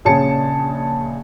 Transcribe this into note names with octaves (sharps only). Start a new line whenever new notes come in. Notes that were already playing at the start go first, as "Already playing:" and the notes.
A#1 C#3 G#4 C#5 A5 C#7